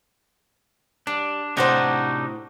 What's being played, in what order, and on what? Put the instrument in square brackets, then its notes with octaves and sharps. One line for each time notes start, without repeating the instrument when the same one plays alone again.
[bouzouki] G3 [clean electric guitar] D4
[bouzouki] A2 F#4 C5 [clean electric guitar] C3 D4 D#4